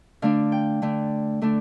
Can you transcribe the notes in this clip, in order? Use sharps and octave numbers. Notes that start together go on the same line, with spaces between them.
D3 A3 D4 F5
G5
D3 A3 D4
D3 A3 D4